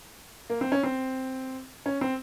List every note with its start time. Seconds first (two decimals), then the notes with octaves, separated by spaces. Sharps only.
0.50 A#3
0.61 C4
0.72 C#4
0.83 C4
1.86 C#4
2.01 C4